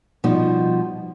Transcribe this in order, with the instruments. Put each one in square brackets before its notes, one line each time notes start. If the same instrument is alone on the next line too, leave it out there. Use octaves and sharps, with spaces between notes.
[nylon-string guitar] B2 F3 G3 D#4